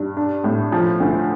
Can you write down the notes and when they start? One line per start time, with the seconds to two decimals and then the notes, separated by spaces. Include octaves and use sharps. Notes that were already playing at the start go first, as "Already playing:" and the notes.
Already playing: G2
0.17 D4
0.44 A2
0.72 F3
1.00 D2